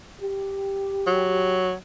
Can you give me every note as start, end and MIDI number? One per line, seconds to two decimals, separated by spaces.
0.20 1.65 67
1.07 1.74 54